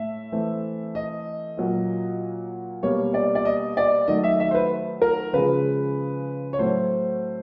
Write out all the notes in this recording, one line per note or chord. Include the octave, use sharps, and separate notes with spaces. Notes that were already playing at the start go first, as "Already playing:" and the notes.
Already playing: A2 A3 E5
E3 A3 C4
D#5
A#2 F#3 A#3
B2 G3 A#3 C#5
D5
D5
D#5
D5
D#3 F#3 A3 D#5
E5
E5
C5
B4
A#4
C#3 F3 G#3 B4
C#5
A2 F#3 A3 C4 C5